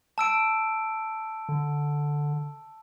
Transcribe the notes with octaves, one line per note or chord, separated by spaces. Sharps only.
A5 E6 D7
D3